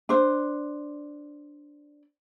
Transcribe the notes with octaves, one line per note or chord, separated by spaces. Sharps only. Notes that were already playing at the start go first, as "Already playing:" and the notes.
D4 C5